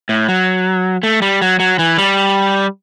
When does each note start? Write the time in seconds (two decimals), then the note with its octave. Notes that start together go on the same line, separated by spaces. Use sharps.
0.09 A2
0.28 F#3
1.03 A3
1.22 G3
1.41 F#3
1.60 F#3
1.79 E3
1.98 G3